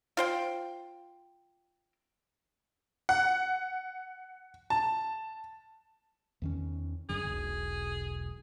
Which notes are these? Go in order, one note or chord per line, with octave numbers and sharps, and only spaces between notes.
F4 C5 G5
F#5
A5
E2 D#3 C#4
G1 F#2 D3 G#4
E1 B1